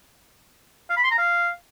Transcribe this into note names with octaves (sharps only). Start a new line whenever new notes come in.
F5
B5
C6
A#5
F5